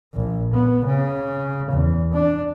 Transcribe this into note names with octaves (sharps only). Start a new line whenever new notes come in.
A#1
B3
C#3
E2
D4